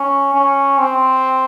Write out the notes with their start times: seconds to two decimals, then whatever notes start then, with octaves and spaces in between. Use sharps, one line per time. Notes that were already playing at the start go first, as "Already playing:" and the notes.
Already playing: C#4
0.34 C#4
0.79 C4